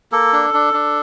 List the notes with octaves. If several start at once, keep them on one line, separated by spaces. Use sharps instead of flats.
A#3 A4
D4
D4
D4